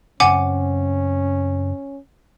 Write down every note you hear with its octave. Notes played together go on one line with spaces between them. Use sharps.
F#2 C#3 C4 C#4 F#5 G#5 D6